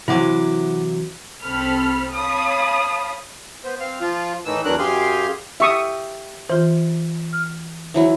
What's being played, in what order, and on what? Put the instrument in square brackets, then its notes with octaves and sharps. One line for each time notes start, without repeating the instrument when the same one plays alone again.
[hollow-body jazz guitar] C3 E3 F#3 [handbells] E4 F#5 D6
[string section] C2 C4 A4 B5 F6
C#5 F5 A5 B5 D#6
[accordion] B3 C5
C4 F5
F3 F4
A2 D#3 E3 E6
E2 E3 F#3 D4 A#4 F#6
F#2 G4 G#4 F5 C6
[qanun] G4 [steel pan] E5 C#6 D#6
[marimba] E3 F4 [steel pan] C5
[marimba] F6
[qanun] E3 F#3 E4